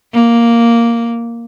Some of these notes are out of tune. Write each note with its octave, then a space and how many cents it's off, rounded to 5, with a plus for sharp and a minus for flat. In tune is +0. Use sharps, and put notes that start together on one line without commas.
A#3 +0